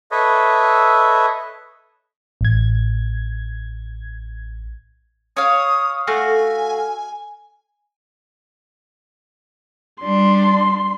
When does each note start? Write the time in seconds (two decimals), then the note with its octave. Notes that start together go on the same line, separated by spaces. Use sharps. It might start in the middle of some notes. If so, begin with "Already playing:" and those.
0.11 A4 B4 C#5 D#5 E5
2.41 A1 G#6
5.37 C#5 F5 D#6
6.07 A3 F#4 F5 G#5
10.03 G3 D4 C6